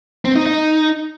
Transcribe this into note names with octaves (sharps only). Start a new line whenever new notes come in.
C4
D#4
D#4